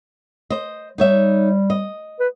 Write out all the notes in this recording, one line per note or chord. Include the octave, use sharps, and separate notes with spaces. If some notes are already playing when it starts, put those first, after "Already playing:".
C5 D#5
G3 D#4 C#5 E5
D#5
B4